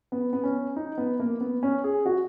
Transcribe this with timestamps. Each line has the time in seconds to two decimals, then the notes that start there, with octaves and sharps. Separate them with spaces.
0.12 B3
0.33 B3
0.44 C#4
0.76 D#4
0.98 B3
1.20 A#3
1.41 B3
1.63 C#4
1.84 G#4
2.06 F#4